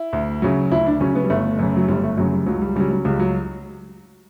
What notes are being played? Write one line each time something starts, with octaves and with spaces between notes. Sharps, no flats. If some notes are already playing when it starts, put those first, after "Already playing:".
Already playing: E4
D2
C#3 F#3
D2 E4
D4
C#3 F#3 C#4
B3
G3
G1 A3
F#2 C#3
F#3
G1 G3
A3
F#2 C#3 F#3
G3
C#2 F#3
G3
C#3 F#3 G3
F#3
C#2 G3
F#3